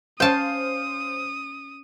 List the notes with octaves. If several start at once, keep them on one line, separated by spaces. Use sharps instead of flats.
C#4 C5 F5 G5 A5 C6 D#6 E7